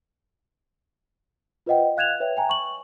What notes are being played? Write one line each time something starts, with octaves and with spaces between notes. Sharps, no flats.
F4 B4 C5 D#5 F#5 G5
F5 F#6 G#6 E7 F7
B4 C#5 E5 G5
G5 G#5 A#5
C#6 F#7